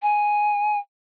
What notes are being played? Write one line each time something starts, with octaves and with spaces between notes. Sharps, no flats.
G#5